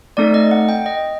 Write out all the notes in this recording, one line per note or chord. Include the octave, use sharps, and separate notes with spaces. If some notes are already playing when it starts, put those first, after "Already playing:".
A3 C4 D#4 A4 D5
D#5
F#5
G5
D#5